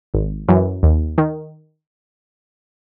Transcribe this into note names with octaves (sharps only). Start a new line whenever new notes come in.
G#1
F#2 E3
D#2
D#3